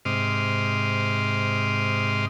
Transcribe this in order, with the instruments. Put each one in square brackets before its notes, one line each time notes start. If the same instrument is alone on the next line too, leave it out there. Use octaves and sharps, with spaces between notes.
[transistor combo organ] G#2 C3 C6 D6 D#6 F6